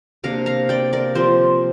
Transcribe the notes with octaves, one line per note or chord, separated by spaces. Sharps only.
C3 A#3 D4 F5 A#5
F5 A#5
D5 G5
A#4 D5
F3 C4 F4 G4 C5